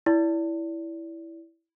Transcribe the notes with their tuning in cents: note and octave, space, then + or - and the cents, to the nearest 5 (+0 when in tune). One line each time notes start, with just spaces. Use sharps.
E4 +0 D5 -25